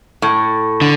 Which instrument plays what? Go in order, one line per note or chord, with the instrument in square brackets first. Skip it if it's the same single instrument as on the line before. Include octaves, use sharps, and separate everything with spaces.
[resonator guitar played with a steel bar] A2
[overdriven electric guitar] D3